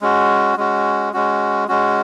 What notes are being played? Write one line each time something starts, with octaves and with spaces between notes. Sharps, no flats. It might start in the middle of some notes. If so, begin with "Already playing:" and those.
G#3 C#4 F#4
G#3 C#4 F#4
G#3 C#4 F#4
G#3 C#4 F#4